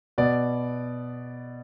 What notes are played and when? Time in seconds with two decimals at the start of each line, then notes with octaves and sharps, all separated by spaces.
0.18 B2 B3 D5